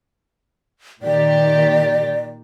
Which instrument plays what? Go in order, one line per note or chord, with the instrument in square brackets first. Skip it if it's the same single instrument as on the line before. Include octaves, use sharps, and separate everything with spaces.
[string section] A#2 D#3 G4 [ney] D5